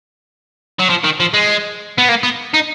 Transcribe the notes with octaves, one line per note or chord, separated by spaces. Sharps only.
F#3
F3
D#3
F3
G#3
B3
A#3
B3
D#4